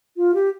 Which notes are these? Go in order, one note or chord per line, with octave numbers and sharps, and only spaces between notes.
F4
G4